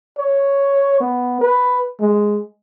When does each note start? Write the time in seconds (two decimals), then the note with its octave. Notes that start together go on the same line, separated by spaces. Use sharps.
0.18 C#5
1.01 B3
1.41 B4
2.00 G#3